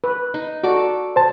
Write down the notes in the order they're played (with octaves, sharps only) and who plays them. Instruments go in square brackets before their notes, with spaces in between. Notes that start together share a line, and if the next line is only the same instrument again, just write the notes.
[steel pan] B4
[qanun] D#4
[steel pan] F#4 [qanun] A4 D5 D6
[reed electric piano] C5 A5